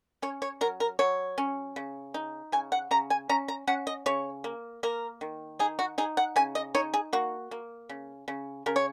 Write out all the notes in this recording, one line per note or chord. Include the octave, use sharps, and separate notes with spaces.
C#4 C#5
C#5
F#3 A#4
A#4
F#3 C#5
C#4
C#3
D#4
C#3 G#5
F#5
C#3 A#5
G#5
C#4 A#5
A#5
C#4 F#5
D#5
C#3 C#5
A#3
A#3 A#4
D#3
D#4 G#4
F#4
D#4 G#4
F#5
C#3 G#5
D#5
D#4 C#5
G#4
A#3 F#4
A#3
C#3
C#3
C#3 A#4
C#5